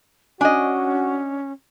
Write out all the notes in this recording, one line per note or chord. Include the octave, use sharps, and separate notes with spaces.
C#4 D4 F#4 D#5 G#5